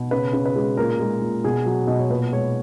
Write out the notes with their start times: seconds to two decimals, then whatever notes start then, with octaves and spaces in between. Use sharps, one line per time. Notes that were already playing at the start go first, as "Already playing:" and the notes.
Already playing: B2
0.11 C#3 B4
0.33 C#3
0.46 B4
0.56 G#3
0.77 A#2 A#4
1.00 G#3
1.22 A#2
1.44 B2 G#4
1.66 F#3
1.87 B2 D#5
1.99 C#5
2.10 A#2 B4
2.32 G#3 C#5